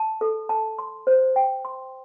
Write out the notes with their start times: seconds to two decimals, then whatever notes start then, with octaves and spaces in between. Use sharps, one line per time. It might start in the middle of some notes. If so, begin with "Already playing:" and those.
Already playing: A5
0.21 A4
0.49 A5
0.79 C6
1.07 C5
1.36 G5
1.65 C6